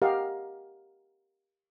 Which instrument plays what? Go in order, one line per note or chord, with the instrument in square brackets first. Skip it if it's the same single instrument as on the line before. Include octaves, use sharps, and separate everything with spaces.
[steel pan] G4 A#4 D#5 F5 F#5